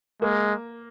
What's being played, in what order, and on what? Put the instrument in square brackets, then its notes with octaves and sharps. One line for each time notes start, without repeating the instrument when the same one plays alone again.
[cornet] G#3 [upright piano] A#3